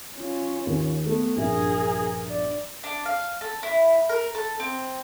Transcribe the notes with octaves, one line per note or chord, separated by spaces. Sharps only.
C#4 F4
D#2
A3 B3 A4
A#1 G2 G#4 A#4 E5
D5
D4
F5
A4
E4
A#4
A4
C4